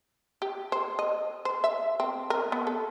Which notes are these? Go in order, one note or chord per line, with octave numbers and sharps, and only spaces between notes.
G4
C5
D#5
C5
E5
C4
A#4
B3
A4